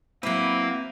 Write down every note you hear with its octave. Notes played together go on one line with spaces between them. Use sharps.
F#3 A#3 C4 E4 B4 E5